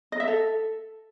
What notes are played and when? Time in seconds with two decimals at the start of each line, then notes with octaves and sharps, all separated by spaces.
0.12 D#5
0.20 E5
0.28 A4